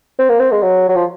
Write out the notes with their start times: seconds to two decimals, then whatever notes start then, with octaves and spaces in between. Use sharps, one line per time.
0.19 C4
0.29 A#3
0.40 C4
0.52 G#3
0.62 F#3
0.89 F#3
0.96 F3